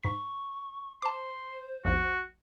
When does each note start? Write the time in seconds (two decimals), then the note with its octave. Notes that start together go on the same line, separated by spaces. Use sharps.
0.04 G#2 C#6 B6
1.02 C5 A5 C6 D6
1.85 A#1 E2 G#2 F#4